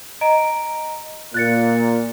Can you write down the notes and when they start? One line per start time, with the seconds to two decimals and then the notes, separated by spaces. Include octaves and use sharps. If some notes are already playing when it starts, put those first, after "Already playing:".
0.21 D#5 A#5 D7
1.34 A#2 F#6 A6 C#7